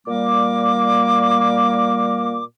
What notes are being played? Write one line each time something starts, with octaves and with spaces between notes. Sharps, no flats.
A#2 G3 A#3 D6